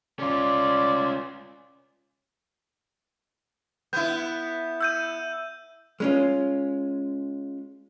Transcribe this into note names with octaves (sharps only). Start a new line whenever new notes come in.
C#4 F4 D5
B3 E4 G6
E6 G6 D#7
G#3 C#4 F4